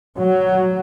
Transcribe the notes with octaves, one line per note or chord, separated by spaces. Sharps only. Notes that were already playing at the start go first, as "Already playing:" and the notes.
F#3